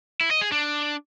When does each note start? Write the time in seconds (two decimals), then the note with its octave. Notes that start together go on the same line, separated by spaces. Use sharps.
0.21 E4
0.31 D#5
0.41 G#4
0.52 D4